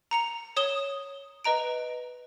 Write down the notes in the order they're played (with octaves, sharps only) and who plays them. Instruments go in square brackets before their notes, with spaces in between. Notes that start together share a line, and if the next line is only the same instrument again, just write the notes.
[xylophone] A#5 C#7 F7
C#5 D#6 E7 G7
B4 D#5 A#5 D7